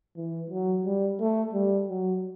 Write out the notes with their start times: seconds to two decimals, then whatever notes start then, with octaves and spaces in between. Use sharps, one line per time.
0.16 E3
0.50 F#3
0.85 G3
1.20 A3
1.53 G3
1.89 F#3